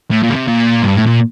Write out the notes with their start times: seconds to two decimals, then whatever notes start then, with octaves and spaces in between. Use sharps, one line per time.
0.11 A2
0.23 A#2
0.29 D3
0.35 C3
0.48 A#2
0.82 G2
0.95 A2
1.06 A#2